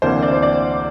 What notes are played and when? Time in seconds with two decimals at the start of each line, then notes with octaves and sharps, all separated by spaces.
0.02 D2 C3 E3 A#3 D4 C5
0.22 D5
0.33 C5
0.43 D5